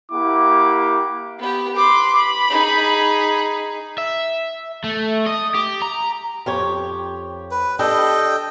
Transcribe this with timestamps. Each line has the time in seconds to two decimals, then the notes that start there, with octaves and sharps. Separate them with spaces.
0.12 A#3 E4 G4 F#5 D6
1.39 B3 G4
1.76 B4 C6 D6
2.19 B5
2.50 D#4 G#4
3.98 E5
4.84 A3
5.27 D#5
5.55 G4
5.82 A#5
6.46 F2 G4 C#5
7.51 B4
7.79 D4 G4 A4 D#5 G5